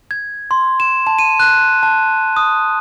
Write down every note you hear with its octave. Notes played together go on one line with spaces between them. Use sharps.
G#6
C6
E7
A5
D#7
F#6
A5
D#6